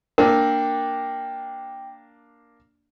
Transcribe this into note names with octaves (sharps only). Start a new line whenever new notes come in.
A#3 D4 A#4 G5